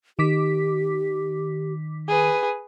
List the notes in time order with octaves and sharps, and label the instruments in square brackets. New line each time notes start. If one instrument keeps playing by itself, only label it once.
[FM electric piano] D#3 D6 B6 [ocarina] G4
[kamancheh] G#4 B4